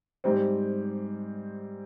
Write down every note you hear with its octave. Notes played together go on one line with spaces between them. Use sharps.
G#2 G3 C4